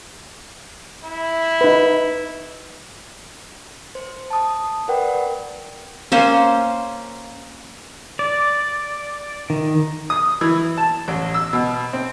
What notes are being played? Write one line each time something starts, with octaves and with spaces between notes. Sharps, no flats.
E4
D#4 B4
C5
A5 D#6
A#4 B4 D5 F#5 G5
A#3 C#4 C5
D5
D#3
D#6
E3
A5
A1
E6
B2
C4